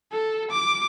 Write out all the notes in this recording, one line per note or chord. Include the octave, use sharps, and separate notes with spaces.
A4
D6